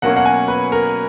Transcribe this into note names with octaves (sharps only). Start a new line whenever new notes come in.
B2 F#3 A#3 C#4 F#5
F#5
G#5
B4
A#4